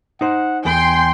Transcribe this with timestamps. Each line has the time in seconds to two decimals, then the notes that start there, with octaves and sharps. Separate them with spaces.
0.21 D#4 C5 F#5
0.65 E2 G5 G#5 C6